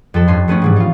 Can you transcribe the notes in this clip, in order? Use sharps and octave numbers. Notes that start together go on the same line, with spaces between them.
F2 A4
G2 C#4 C6
A3 B3 C#4 E4
G#2 E3 G3
D#4 F4